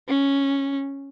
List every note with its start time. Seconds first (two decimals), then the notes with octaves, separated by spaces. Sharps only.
0.08 C#4